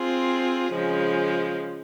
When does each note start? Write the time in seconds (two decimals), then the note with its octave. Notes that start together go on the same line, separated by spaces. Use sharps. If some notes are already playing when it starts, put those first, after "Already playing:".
Already playing: C4 F4 G#4
0.73 C#3 F3 G#3